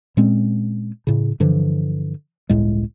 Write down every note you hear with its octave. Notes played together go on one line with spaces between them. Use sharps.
A#2 G#3 C4 C#4
A2 C#3
G2 D3 E3 F3
G1 C#2 A2 G#3